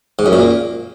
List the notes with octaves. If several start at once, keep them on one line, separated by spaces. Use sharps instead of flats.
G#2
F#2
A#2